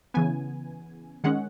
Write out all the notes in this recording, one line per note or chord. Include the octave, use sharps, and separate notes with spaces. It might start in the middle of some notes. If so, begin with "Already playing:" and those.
C#3 E3 B3 G#5
D#3 G#3 C#4 F#5